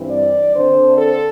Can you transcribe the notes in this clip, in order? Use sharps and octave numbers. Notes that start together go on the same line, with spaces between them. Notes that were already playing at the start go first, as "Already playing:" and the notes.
Already playing: G2 E3 C4
D5
D3 C4 C5
A4